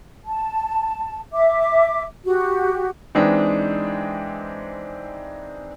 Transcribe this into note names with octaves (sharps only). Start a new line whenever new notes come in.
A5
E5 D6
F#4 G4
E3 G#3 C4 D4 D#4